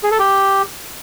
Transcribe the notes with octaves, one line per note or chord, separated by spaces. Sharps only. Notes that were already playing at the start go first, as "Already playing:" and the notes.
G#4
A4
G4